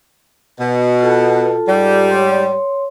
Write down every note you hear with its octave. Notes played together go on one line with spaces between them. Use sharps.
B2
F4 A4 A5
G#2 G3
C#5 C6